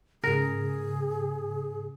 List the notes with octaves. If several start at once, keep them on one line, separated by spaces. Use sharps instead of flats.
G#2 C#3 G#4 A#4